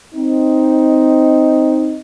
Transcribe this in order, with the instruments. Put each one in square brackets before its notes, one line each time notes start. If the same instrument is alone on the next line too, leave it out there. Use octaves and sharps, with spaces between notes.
[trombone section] C4 D#4